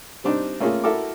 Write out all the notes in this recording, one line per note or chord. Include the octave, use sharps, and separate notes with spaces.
G3 C4 D4 D#4
A3 A#3 C#4 F4 G#4
E4 F#4 A4 A#4 D6